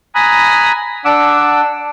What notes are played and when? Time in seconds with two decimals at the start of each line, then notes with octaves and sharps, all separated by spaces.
0.15 G#5 A#5 B5 D#6 F#6
1.05 D4 F#5 D6 E6